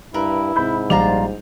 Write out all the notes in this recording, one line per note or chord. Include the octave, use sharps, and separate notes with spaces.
G2 E4 A#4 B4
G#2 C3 B5 G6
A#1 G3 D4 F4 A#5 F7